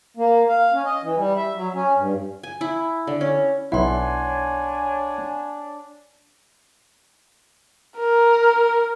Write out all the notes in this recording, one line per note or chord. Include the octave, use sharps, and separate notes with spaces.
A#3
F5
C#4
D#5
E3
G3
E5
F#3
C#4
G2
G#5
E4
D3
C#4
B1 D4 E4 C#5 F#5 G#5 C6
A#4